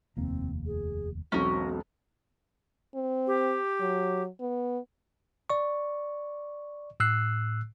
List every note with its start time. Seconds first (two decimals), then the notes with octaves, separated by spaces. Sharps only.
0.17 F1 D#2 A#3 C4
0.66 G#4
1.32 E1 B1 C4 C#4 F#4 A#4
2.95 C4
3.27 G4
3.80 F#3
4.40 B3
5.50 D5 C#6
7.00 A2 E6 F#6 C7